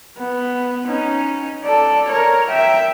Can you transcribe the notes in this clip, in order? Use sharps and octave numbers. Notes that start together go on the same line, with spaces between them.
B3
C#4 D#4
A4 D5
A#4 C#5
E5 G5